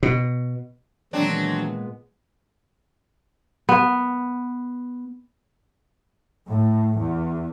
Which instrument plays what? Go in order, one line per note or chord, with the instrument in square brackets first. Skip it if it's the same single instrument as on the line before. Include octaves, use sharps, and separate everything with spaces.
[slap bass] B2
[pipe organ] A#2 G#3 B3 [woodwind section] D#3 E3 [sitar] F#3 C4 D4
[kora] B3
[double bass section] A2
E2